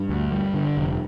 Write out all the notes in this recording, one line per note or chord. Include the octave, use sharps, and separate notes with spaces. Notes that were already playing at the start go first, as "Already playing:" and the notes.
Already playing: G2
D2
G3
D3
F1